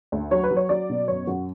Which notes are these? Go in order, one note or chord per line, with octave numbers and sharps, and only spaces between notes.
D2
F#3 C#5
B4
F#3
C#5
F#3 D5
B2
F#2 C#5
F#2 F#4